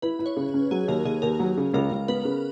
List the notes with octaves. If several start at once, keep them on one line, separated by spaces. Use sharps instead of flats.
E4 B4
E4
C#5
C#3
C#4
F#3 G#4
D#2 A#4
D#2 G#4
D#2 A#4
F#3
C#3
C#2 A#4
C#2
B3 B4
C#3